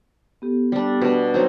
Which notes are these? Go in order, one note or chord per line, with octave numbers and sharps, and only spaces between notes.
B3 G4 A4
G3 D4
B2 D4
F#3 C4 D#4